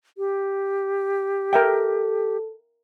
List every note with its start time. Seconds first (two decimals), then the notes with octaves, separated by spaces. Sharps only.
0.18 G4
1.53 A4 A#4 E5 G5